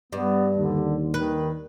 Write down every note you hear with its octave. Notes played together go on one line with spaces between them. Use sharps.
G2 B3
D#2 D3
D#3 B4